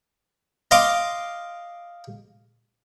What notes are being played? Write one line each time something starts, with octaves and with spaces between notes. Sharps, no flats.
D#5 F5 C6 D6